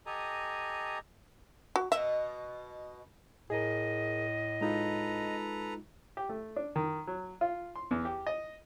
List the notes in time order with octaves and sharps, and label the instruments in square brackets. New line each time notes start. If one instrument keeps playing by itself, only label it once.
[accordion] G4 A4 D#5 G#5 A#5
[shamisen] F#4
[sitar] B2 D#5 [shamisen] E5
[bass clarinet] A2 [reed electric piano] G#4 A#4 [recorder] D#5
[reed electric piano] G#3 D#4 F4 [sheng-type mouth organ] A4 B4 A#5
[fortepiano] G4
A3
D4
D#3
F#3
F4
C6
E2
G4
D#5